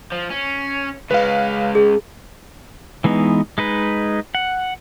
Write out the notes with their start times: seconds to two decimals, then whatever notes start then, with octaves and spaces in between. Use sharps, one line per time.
0.12 F3
0.30 C#4
1.11 C#3 G#3 B4 F5
1.75 G#4
3.04 E3 G#3 B3 D#4
3.58 G#3 D#4 B4
4.35 F#5